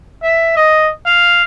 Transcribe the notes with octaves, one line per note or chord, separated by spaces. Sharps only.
E5
D#5
F5